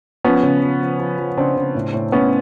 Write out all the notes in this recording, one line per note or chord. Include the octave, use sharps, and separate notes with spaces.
F3 B3 C#4
C#3
F3
F3
F3
F3
C#3 C4 D4
C#3
A2
A2
A2 B3 C#4